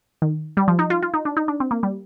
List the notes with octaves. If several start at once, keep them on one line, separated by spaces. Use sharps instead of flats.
D#3
G3
F3
D#4
F4
F4
D#4
D4
D#4
D4
C4
A#3
G3